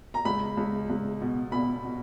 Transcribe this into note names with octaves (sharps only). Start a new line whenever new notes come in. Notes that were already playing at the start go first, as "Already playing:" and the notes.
A#5
C#2 B5
C#2
C#2
B2
B2 B5
B2